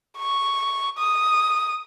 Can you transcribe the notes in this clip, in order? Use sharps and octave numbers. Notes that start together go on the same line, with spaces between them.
C#6
D#6